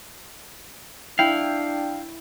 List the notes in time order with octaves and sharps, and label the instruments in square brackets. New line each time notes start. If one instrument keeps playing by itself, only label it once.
[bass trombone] D4 [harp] E4 [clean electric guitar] F5 [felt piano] G5